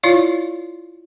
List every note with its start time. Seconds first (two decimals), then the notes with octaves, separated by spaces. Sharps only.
0.03 E4 F4 C#5 D5 F5